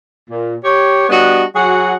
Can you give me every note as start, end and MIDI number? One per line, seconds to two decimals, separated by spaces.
0.30 0.55 46
0.64 1.06 67
0.64 1.06 73
1.09 1.43 55
1.09 1.43 59
1.09 1.43 62
1.09 1.43 66
1.09 1.43 75
1.55 1.95 54
1.55 1.95 66
1.55 1.95 68
1.55 1.95 78